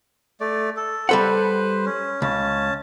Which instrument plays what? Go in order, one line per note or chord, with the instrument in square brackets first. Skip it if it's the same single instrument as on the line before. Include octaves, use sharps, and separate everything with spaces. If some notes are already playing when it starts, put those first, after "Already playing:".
[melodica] A3 D5
A4
[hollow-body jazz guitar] G3 A4 F#5 [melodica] B4 C5
[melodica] C#4
[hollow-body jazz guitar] C#2 [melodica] C#4 A5